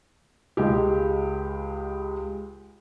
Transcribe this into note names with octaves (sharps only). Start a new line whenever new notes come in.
C#2 G#3 G4